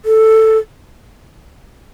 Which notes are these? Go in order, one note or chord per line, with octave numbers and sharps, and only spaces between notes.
A4